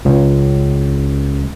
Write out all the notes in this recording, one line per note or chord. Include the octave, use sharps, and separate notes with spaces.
C#2